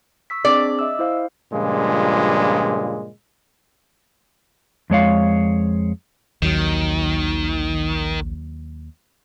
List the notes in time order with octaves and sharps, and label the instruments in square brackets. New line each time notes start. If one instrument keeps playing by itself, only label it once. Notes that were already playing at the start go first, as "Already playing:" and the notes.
[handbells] C#6 E6 B6
[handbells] C4 D4 G#4 [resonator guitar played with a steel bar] D5
[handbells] D#5 E5 E6
E4 C5 F5
[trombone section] G2 A#2 C#3 F3 G#3
[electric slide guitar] F2 G#3 C#5 F5
[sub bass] A#1 [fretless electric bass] D#2 F#3 [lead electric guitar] D#3